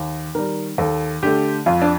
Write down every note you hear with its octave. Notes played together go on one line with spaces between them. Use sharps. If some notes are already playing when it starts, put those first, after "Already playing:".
Already playing: D#2
D#3 G3 A#4
D#2 A4
D3 A3 G4
F2 F4
D4